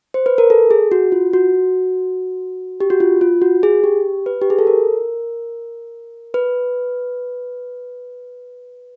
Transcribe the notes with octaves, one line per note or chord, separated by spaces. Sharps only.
C5
B4
A#4
A4
G#4
F#4
F4
F#4
G4
F#4
F4
F4
F#4
G#4
G4
B4
G4
G#4
A4
A#4
B4